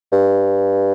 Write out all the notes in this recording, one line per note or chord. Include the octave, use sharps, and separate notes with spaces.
G2